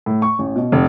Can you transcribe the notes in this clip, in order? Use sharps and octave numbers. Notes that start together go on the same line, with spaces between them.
A2
C#6
A1
B2
F1